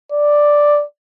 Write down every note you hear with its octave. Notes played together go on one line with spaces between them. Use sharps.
D5